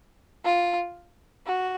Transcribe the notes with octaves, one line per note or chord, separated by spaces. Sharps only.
F4
F#4